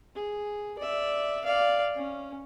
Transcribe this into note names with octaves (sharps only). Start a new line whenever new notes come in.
G#4
D5 E5
D5 F5
C#4